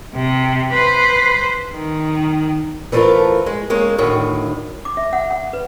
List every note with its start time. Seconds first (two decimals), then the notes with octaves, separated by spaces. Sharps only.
0.15 C3
0.73 B4 C5
1.75 D#3
2.92 E3 F3 A3 D#4 F4 A#4
3.46 G#3
3.70 G#3 A#3 C#4
3.98 D2 A2 D#3
4.85 D6
4.97 E5
5.13 F#5
5.31 F#5
5.53 B4